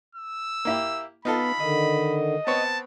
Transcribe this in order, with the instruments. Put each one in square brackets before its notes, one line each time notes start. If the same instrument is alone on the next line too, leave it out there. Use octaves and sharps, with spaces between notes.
[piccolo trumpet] E6
[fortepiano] A#3 E4 G4
[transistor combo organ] B3 [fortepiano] D#4 F4 A4 [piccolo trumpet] B5
[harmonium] D3 D#3 [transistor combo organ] D#5
[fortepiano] B3 C4 C#5 [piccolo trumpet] A5